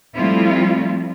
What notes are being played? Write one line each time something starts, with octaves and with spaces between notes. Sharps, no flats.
F3 G3 A3 C4 E4 F4